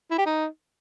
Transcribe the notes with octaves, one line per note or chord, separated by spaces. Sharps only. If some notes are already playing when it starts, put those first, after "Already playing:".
E4
G4
D#4